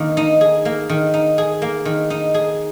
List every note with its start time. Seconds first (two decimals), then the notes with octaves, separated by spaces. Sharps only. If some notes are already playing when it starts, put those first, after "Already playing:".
Already playing: D#3 A#3
0.17 D#4
0.41 G#4
0.65 A#3
0.89 D#3
1.14 D#4
1.38 G#4
1.62 A#3
1.85 D#3
2.10 D#4
2.34 G#4